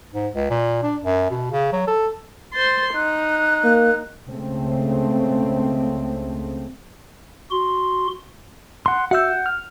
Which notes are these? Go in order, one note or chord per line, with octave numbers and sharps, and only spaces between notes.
G#2
C#2
A#2
D4
F#2
B2
C#3
F#3
A4
C5 C6 A6
D#4 F#6
A#3
C#2 C#3 A3 C4
F#4 C6
F#5 C6
F#4 E5 F#5 E6 G6
F6